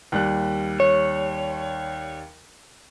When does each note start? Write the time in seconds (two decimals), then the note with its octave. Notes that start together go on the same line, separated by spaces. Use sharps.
0.12 D#2 G3 F#6
0.80 C#5